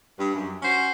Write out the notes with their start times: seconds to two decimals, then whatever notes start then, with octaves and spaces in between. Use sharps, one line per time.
0.19 G2
0.35 F#2
0.62 C#4 F#4 C5